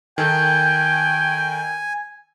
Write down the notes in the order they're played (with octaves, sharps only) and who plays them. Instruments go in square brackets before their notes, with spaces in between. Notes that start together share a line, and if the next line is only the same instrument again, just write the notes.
[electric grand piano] D#3 A4 [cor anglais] G5 [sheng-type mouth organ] G#5